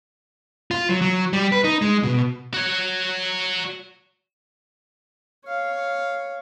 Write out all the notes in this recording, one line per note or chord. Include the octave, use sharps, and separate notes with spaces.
F4
F#3
F#3
G3
B4
D#4
G#3
B2
F#4 C#5
C#5 F5